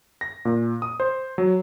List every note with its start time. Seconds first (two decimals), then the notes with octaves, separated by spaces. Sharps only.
0.21 A#6
0.45 A#2
0.82 D#6
1.00 C5
1.38 F#3